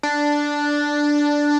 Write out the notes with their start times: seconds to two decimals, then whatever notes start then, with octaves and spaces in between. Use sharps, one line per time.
0.03 D4